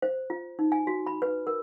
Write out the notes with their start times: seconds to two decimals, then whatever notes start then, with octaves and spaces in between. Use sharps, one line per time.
0.02 C5
0.30 F4
0.59 D#4
0.72 G#5
0.87 F#4
1.07 B5
1.22 B4
1.47 A#4